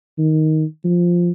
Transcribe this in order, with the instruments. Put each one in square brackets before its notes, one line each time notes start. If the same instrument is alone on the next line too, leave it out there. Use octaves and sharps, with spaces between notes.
[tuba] D#3
F3